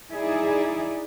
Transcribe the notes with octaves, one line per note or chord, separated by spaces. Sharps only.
D#4 E4 G#4 D5